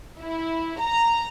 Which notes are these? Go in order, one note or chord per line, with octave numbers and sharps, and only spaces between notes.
E4
A#5